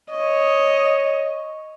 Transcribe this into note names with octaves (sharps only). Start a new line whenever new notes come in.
C#5 D#5